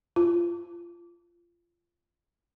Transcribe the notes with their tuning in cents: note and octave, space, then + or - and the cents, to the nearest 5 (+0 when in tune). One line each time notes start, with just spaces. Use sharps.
F4 -20